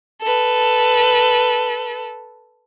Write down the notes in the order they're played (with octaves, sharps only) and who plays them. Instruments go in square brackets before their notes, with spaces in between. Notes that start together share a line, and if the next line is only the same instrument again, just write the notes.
[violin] A4 B4